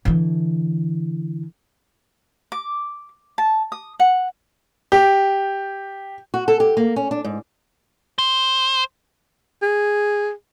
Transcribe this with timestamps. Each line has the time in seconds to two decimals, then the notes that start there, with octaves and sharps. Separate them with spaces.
0.05 D3 E3
2.52 D6
3.38 A5
3.72 D#6
4.00 F#5
4.92 G4
6.34 F#4
6.48 A4
6.60 G4
6.77 A#3
6.96 C#4
7.11 D4
7.24 G#2
8.19 C5
9.62 G#4